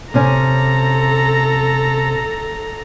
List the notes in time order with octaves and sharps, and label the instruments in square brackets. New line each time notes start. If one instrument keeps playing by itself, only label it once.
[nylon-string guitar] C3 C#4 [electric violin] A4 A#5